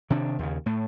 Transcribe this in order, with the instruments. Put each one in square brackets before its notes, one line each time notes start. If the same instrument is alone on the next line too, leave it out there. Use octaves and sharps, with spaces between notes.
[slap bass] C3 D#3 D4
D#2 C#3
A2 A3